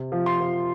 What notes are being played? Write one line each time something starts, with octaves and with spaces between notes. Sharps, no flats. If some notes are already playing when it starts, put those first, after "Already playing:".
Already playing: C3
F3
C6
F3